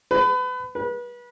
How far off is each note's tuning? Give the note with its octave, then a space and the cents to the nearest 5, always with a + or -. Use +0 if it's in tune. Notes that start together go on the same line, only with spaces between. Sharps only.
B4 +30
B4 -30